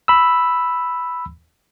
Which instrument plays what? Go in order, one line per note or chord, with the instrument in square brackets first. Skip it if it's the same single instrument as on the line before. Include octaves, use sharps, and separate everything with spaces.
[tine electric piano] B5 E6